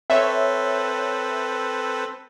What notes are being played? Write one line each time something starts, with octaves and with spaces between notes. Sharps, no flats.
C4 A4 B4 C#5 E5